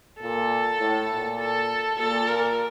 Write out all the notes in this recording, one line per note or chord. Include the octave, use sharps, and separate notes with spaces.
A#2 A4
A2
A#2
A4
A#2 A4
A#2 A#4